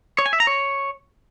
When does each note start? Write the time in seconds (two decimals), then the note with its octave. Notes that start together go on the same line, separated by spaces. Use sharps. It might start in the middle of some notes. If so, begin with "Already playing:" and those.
0.19 C#5
0.26 G#5
0.33 E5
0.40 A#5
0.47 C#5